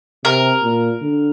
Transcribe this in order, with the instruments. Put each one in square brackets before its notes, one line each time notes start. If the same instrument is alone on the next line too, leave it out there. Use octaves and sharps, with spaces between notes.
[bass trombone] C3 [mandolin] A#4
[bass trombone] A#2
D3